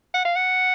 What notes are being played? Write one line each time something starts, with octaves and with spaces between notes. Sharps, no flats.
F#5
F5
F#5